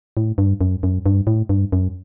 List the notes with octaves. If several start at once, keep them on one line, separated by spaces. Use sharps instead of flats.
A2
G2
F#2
F#2
G2
A2
G2
F#2